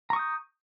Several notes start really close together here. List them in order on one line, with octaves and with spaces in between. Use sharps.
A#5 C#6 D#6 G6